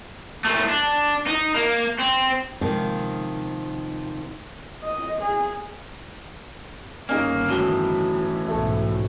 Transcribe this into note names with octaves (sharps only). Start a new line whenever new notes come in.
A#2 A3
D4
D#4
A#3
C4
C3 D#3 F3 G#3 A#3 D#4
D#5
G#4
G1 D#3 A#3 C#4 D#4 G#4
A2 E3 F#3
B1 G#2 A3 A4